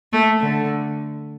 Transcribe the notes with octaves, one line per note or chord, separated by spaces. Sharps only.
A3
D3